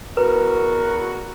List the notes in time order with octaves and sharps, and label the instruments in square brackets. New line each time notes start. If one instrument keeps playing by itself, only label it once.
[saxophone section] E2 F#4 [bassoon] A#4 [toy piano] B4